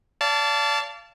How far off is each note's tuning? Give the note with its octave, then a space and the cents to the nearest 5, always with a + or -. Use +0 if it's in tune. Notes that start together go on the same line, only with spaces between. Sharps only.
D5 -35 F5 -25 A5 +0